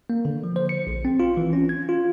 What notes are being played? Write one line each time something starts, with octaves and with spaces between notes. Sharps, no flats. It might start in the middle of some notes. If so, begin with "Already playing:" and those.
A#3
D3
F3
C5
C#7
A#1
C4
F4
E3
C#4
G#6
F4